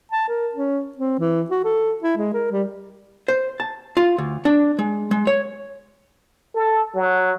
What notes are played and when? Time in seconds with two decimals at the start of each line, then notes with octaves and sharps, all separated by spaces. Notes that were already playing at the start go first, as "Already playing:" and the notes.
0.12 A5
0.28 A#4
0.55 C#4
0.97 C4
1.19 E3
1.50 F#4
1.65 A4
2.02 E4
2.17 G#3
2.34 A#4
2.51 G3
3.28 C5
3.60 A5
3.97 F4
4.18 D2
4.45 D4
4.79 G#3
5.11 G#3
5.27 C#5
6.55 A4
6.95 F#3